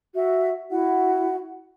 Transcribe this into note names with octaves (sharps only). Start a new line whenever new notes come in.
F#4 E5
E4 F#4 F#5